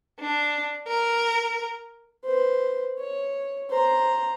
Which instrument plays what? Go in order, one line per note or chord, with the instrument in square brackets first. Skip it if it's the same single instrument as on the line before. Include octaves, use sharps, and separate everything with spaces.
[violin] D4
A#4
[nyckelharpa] B4 C5
C#5
C5 A#5